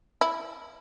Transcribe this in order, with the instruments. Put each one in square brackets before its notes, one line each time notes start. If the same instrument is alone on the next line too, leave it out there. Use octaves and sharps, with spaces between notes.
[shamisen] E4